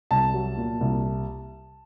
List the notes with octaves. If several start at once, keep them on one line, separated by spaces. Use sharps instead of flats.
C2 A5
F#3
A#2
C2